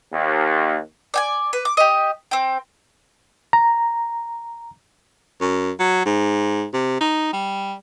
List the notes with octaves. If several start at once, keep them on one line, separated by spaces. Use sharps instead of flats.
D#2
D5 G5 G#5
B4
D6
G4 D#5
C4 G5
A#5
F#2
F#3
G#2
C3
D#4
G3